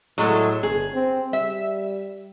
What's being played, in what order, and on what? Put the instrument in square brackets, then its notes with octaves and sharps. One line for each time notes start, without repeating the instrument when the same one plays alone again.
[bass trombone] A2 [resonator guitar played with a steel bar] F#3 G#3 A3
[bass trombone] G1 [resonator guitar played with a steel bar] G#4
[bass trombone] C4
[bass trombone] G3 [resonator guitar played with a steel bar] E5